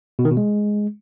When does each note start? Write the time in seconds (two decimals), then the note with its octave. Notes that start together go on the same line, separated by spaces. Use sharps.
0.19 B2
0.25 D#3
0.31 B2
0.37 G#3